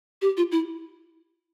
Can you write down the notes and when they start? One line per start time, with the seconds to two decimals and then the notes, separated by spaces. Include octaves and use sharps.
0.22 G4
0.37 F4
0.52 E4